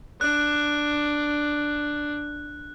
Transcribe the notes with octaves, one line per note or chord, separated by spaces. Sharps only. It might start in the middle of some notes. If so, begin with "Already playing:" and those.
D4 F#6